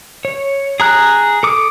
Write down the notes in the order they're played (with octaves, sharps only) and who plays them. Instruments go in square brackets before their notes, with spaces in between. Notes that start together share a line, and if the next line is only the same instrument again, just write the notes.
[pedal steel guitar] C#5
G#4 A#5 F#6
A4 D6 D#6